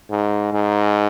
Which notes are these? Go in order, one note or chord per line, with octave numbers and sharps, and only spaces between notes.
G#2
G#2